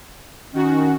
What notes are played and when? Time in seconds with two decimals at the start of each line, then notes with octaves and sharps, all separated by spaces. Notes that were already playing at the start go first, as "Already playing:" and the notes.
0.54 D#3 C#4 F#4